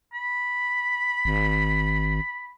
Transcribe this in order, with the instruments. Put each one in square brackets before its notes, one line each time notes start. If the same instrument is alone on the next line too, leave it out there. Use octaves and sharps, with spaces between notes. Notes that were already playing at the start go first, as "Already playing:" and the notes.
[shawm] B5
[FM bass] G#1